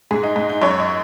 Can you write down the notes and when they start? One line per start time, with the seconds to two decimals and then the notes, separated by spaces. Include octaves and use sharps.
0.11 G#2 G#4
0.23 D#4
0.36 G#2 D#4
0.49 D#4
0.62 F#2 C#5
0.80 D#5